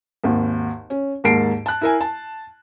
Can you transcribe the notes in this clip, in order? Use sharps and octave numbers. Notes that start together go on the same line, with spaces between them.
G#1 D#2
C#4
D#2 G#2 A#4 A5 C7 D7
A5 F#6
E4 A#4 G#5
A5